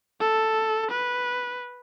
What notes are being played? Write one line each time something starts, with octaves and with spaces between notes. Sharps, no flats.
A4
B4